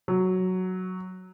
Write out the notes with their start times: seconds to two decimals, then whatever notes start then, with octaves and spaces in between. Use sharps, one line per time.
0.08 F#3